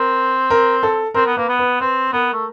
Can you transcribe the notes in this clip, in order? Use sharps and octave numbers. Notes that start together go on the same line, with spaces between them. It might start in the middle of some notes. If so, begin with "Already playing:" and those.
Already playing: C4 A#4
A#4
A4
C4 A#4
B3
A#3 B4
B3
B4
C4 B4
B3 A#4
A3